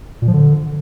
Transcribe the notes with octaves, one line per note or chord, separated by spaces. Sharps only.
A#2
F3
D3